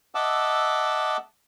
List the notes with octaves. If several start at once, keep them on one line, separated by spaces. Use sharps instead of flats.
D#5 E5 F#5 A5 D6 E6